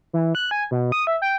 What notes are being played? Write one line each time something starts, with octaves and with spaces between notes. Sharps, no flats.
E3
F#6
G#5
B2
D#6
E5
G5